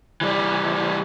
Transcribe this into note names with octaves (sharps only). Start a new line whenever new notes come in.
E3 G3